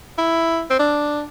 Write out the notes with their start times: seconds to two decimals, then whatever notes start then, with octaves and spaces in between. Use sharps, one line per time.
0.18 E4
0.70 C4
0.79 D4